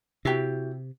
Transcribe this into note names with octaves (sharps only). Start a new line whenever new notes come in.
C3 E4 F#4 G4